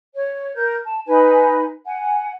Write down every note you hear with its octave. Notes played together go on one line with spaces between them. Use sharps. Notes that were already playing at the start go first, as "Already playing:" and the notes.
C#5
A#4 G6
A5
D#4 B4 G#5
F#5 G#5